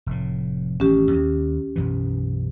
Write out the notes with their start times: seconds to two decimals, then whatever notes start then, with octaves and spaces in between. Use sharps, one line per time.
0.06 F1 A2
0.80 A1 D#3 C#4 G4
1.12 D#2
1.76 B1 F#2 E3